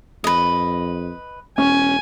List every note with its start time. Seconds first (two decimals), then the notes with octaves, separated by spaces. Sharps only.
0.24 F2 B4 D#5
1.58 E1 C#4 G#5